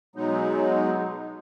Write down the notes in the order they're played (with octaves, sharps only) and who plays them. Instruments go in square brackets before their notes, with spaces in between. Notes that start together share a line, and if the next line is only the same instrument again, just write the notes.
[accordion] B2 F#3 G#3 B3 D#4